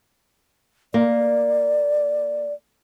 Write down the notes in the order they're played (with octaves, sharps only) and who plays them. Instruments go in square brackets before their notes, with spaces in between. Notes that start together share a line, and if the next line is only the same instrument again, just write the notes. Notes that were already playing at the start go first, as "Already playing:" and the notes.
[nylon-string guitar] A#3 [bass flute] D5